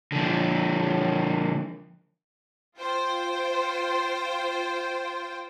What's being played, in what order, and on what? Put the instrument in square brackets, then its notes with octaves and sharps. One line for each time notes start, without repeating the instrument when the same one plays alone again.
[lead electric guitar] D3 F3
[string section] F4 C5 G5